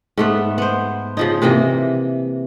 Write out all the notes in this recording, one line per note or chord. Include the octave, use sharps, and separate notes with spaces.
G#2 A3 B3
B3 C5
C#3 F3 D#4
C3 E3 A#3 D#5